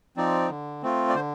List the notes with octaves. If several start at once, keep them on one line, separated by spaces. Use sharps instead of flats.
F3 C4 D#4 D5
D3
A3 C4 F4
D5
D3 C5